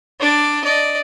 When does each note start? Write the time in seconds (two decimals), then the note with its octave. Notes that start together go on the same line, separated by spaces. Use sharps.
0.20 D4 D5
0.64 D5 D#5